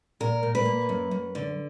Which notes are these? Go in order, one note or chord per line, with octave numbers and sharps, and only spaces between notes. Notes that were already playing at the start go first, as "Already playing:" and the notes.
A#2 A#4
A#2
B4
A#3
F#2
F#2
D3